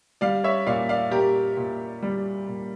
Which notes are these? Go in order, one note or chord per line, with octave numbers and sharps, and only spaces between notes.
G3 D5 F5
C#5 E5
A#2 D5 F5
D5 F5
A#2 G4 A#4
A#2
G3
A#2